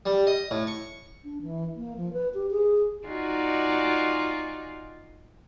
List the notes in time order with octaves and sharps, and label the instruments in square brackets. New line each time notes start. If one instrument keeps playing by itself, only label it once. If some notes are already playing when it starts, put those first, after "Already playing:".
[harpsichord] G3
D#5
A2
C#6
[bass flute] D4
E3
A#3
F3
B4
G4
G#4
[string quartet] D#4 F4 F#4 D5 G#5